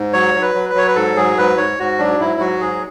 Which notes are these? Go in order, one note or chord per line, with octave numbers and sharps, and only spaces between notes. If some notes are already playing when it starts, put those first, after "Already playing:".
Already playing: G#2
F#3 C#5
F#3
B4
F#3
B4
F#3 C#5
B4
G#2 A4
F#3 G#4
G#2 B4
G#2 C#5
G#2 F#4
F#3 D4
G#2 E4
F#3 F#4
G#2 G#4